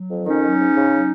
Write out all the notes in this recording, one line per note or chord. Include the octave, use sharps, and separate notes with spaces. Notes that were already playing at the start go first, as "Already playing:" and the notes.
Already playing: F#3
F2
D#3 C#4 D#4
F#3
G#2
C#3
F#3